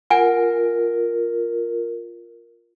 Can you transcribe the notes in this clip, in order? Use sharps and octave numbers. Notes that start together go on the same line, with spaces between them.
F4 A#4 F#5 G#5